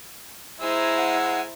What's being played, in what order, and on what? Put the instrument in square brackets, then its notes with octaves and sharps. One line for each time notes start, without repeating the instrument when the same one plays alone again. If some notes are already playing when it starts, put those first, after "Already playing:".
[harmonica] G#3 G#5 E6 [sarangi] E4 [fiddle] C5 A#5
[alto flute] F#5